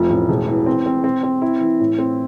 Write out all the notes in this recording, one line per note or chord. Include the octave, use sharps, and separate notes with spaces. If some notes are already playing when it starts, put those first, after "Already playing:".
Already playing: F1 F3
A1
E1
E3
C4
C4
C4
C4
E4
E3
A2
C4